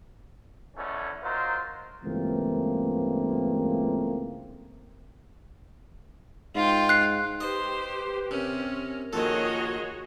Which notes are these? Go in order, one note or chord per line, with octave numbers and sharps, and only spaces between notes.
E2 G#2 A3 C#4
F#3 D#4 F4 A#4 C5
C#2 G2 E3 A3 A#3 C4
G#2 F4 G5
F#6 C7
G4 B4 C5 D#5
C3 C#4 A#4
A#1 D#3 F4 F#4 G#4 A4 C#5 D#5